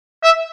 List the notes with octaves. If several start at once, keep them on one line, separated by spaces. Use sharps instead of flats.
E5